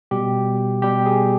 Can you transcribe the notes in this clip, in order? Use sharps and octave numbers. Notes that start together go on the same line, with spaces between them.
B2 G3 G4
B2 G3 G4
G#4